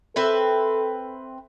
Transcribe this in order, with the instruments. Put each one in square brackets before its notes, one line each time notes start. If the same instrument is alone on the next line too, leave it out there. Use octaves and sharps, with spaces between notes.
[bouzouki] C4 B4 E5 [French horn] A4